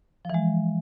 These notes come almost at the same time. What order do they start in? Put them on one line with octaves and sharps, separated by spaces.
F3 E3 G#3